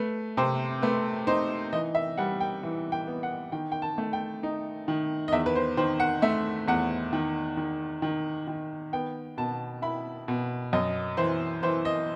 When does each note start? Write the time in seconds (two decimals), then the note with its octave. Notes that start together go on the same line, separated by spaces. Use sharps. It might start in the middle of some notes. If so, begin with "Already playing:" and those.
Already playing: A3 B4
0.37 C3 C5
0.82 A3 B4
1.27 D#4 C5
1.73 E3 D#5
1.95 E5
2.17 G3 F#5
2.40 G5
2.63 E3
2.92 G5
3.07 B3
3.23 F#5
3.52 D#3 G5
3.72 G5
3.82 A5
3.98 A3
4.13 G5
4.43 D#4
4.88 D#3
5.28 D#5
5.32 E2 E5
5.46 B4
5.55 C5
5.77 D#3 C5
6.00 F#5
6.22 A3 E5
6.68 E2 F#5
7.13 D#3
7.57 D#3
8.02 D#3
8.47 D#3
8.93 B3 G5
9.38 B2 A5
9.82 E4 B5
10.28 B2
10.73 F#2 D#5
11.17 E3 C5
11.63 E3 C5
11.85 D#5